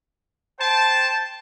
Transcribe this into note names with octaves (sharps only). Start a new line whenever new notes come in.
C5 G5 A5